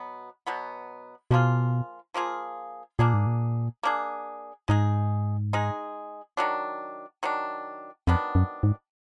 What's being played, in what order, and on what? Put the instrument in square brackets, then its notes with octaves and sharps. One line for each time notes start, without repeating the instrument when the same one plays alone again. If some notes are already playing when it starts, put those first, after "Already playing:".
Already playing: [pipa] B2 F#3 B3
B2 F#3 B3
[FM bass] B2 [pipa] F3 A#3 F4 G#4
[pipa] F3 A#3 F4 G#4
[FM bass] A#2 [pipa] A#3 D4 G#4
[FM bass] G#2
A#2
[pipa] A#3 D4 G#4
[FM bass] G#2 [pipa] G#3 D#4 G#4
[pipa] G#3 D#4 G#4
D#3 F#3 D4
D#3 F#3 D4
[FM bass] F2 [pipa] D#3 F#3 B3 D4
[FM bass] F#2
G#2